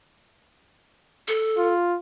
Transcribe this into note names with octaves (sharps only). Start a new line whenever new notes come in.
A4
F4